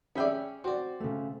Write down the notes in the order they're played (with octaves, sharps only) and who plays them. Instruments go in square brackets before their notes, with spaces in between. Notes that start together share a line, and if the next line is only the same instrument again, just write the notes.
[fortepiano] C#4 G#4 E5 [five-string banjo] D5 G5 B5
[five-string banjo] C4 D5 [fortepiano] F#4
[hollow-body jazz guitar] C#3 A3